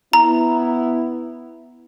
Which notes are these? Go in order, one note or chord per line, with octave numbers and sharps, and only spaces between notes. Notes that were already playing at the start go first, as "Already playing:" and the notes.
B3 E4 A#5